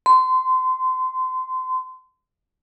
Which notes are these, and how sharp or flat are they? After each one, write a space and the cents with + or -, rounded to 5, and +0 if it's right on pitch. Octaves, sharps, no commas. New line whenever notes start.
C6 -25